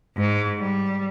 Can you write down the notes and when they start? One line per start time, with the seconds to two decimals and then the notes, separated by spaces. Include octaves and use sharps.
0.16 G#2
0.59 G3